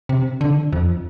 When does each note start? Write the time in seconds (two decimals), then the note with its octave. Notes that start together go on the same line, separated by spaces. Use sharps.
0.09 C3
0.41 D3
0.73 F2